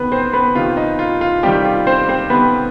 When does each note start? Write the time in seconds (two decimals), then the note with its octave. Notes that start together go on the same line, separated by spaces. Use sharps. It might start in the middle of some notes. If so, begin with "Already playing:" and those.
Already playing: C3 D#3 B3 B4
0.12 C4 C5
0.33 B3 B4
0.55 C3 D#3 F4
0.77 D#4
0.99 F4
1.21 F4
1.43 C3 D#3 G3 G4
1.64 F4
1.87 C4 C5
2.09 C4 C5
2.30 C3 D#3 B3 B4